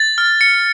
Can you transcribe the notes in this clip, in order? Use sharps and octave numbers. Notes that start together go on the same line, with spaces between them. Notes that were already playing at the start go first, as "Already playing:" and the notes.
Already playing: A6
F6
C#7